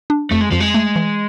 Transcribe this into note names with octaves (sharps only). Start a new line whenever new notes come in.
D4
F2 A3
G#3
F2 F3
G#3
A3
E3